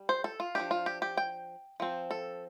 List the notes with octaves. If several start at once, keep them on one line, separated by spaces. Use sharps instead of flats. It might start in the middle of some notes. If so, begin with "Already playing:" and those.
Already playing: G3
C5
A4
F4
F3 A3 D4 G4
F4
G4
G4
G5
F3 C4
A4